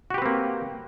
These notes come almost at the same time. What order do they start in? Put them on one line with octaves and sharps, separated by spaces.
F#4 G4 B4 C4 A#3